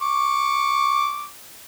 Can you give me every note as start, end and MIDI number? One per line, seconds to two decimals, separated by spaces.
0.02 1.28 85
0.02 1.28 86